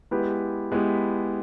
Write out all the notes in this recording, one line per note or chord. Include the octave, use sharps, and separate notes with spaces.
G#3 B3 E4 G4 B4
G#3 B3 E4 G4 B4